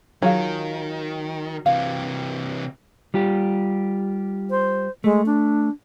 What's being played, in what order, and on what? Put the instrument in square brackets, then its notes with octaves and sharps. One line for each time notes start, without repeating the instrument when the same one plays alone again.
[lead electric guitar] D#3 [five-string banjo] F#3 [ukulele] F4 G#4 F5
[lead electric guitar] C3 E3 [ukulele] F5
[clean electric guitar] G3 F4 G4
[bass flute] C5
[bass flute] G#3 [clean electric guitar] A3
[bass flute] D4